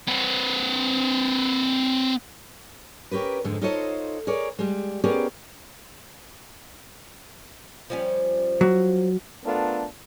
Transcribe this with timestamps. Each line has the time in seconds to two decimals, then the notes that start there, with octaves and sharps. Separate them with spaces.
0.08 C4 B4
3.11 C#4 G4 A#4 B4
3.44 F2 G#2 D3 G#3
3.61 D#4 F4 A4 C5 C#5 D#5
4.27 G#4 A#4 C#5 D5
4.59 G3 G#3
5.04 B3 C#4 G4 G#4 A#4 D5
7.90 F3 G3 C#4
8.61 F#3
9.45 A3 B3 D4 F4 A4 A#4